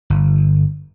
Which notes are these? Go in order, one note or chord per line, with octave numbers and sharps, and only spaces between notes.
G1